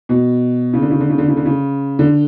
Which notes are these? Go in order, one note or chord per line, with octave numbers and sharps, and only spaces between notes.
B2
C#3
D3
C#3
D3
C#3
D3
C#3
D3
C#3
D3